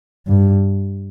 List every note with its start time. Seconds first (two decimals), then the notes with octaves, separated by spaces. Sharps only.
0.27 G2